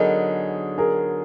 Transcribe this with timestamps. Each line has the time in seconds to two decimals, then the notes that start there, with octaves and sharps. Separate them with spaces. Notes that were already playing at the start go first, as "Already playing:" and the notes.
Already playing: D3 F#3 B3 D#4 G#4 A#4
0.78 G#4 A#4